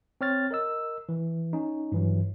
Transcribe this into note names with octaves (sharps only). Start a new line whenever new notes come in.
C4 C#5 F6 A6
A#4 D#5 E6
E3
C#4 D#4
G2 E3 F#3